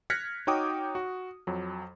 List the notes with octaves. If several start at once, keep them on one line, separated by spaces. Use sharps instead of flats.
F6 F#6 G#6 A#6 B6 C#7
D#4 F#4 C#5 G5 D6 D#6
F#4
F2 F#3